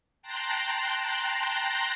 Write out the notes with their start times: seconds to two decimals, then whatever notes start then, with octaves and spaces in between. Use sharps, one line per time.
0.22 G5 A5 A#5 C6 F#6 A#6